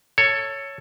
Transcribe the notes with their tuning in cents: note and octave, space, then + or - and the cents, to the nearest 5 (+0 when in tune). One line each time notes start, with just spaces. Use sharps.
A4 +15 C#5 +0